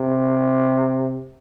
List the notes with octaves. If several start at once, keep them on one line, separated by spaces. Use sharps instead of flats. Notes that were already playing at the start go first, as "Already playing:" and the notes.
Already playing: C3